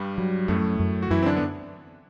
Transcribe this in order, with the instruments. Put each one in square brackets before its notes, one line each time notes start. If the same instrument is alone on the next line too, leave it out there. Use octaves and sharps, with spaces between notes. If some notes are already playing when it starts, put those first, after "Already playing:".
Already playing: [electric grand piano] G2 G3
[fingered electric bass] F#3
[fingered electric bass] F#2 [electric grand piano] A2 A3
[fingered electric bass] F#2
[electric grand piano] F#4
[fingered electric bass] F#2 [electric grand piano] E3 E4
[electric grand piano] C4
D3 D4
B3